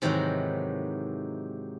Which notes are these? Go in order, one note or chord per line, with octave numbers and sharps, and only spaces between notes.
G#2 C3 D#3 E3 F#3 F#4